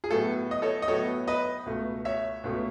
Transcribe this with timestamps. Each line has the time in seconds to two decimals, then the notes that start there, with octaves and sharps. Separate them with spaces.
0.04 G#4
0.10 A2 F#3 B3 A4
0.51 D#5
0.62 A4 C#5
0.82 D#5
0.88 A2 F#3 B3 A4 C#5
1.28 B4 D#5
1.66 C#2 B2 A3
2.05 C#5 E5
2.44 C#2 B2 A3